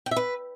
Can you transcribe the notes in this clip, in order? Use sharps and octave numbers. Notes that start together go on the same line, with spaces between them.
G5
E5
B4